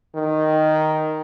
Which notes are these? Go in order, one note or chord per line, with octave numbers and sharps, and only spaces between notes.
D#3